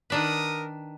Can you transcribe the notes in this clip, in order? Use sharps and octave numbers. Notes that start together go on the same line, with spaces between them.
D#3 D4 A#4 B4 D#6